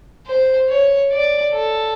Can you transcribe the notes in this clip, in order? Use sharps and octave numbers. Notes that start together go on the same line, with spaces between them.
C5
C#5
D5
A4